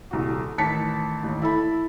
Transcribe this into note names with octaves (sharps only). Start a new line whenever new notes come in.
D#1 C2 F#4
A1 D#3 A5 B6 C#7
A1 D#2 D#3
E4 A4 B5